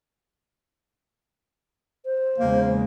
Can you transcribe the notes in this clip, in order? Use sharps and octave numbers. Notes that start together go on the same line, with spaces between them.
C5
E2 C#3 G#3 A#3